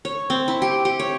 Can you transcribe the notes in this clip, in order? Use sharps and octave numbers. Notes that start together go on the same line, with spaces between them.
C#5
C4
E4
G4
G4
C#5